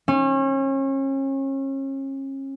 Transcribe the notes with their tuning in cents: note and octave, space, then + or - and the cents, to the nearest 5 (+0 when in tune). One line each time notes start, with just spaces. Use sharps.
C#4 -35